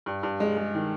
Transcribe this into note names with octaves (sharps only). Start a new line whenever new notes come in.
G2
G2
G#3
G#3
D#3